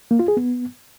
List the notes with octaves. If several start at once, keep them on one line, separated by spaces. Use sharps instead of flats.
A#3
F4
G#4
B3